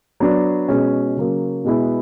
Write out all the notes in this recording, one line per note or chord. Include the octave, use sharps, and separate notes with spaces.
F#3 B3 D4
B2 G#3 C#4
C#3 F#3 A#3
B2 G#3 B3 E4